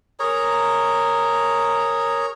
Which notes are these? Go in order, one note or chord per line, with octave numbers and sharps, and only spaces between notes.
G#4 A#4 C#5 A#5